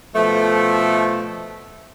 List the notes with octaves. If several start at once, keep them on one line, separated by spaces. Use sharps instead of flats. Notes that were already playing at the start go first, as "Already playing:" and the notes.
B2 F3 A3